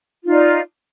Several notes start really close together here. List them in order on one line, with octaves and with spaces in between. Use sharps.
F4 D#4 D5